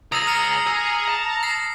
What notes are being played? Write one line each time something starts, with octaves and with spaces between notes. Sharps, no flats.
C#2 G#4 A#5 D#6 E6 A#6
F6 C#7
G#4 E6
A5
A#6 C7